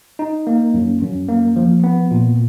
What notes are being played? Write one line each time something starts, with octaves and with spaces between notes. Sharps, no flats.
D#4
A#3
F#2
F#2
A#3
F3
B3
A#2